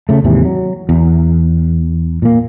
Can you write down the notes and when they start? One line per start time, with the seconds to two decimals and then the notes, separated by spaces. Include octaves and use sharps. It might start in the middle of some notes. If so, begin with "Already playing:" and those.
0.09 C#3 A3
0.24 D#2 G#2 C3 E3
0.45 F#3
0.89 E2
2.22 A#2 A#3